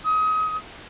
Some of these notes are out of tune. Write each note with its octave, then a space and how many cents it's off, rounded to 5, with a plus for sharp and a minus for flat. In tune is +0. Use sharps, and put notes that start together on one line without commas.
D#6 +25